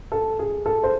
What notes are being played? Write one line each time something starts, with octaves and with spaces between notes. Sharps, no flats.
A4
G#4
A4
C5